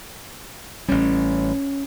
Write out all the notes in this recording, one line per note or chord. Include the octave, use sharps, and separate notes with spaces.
A1 G3 C#4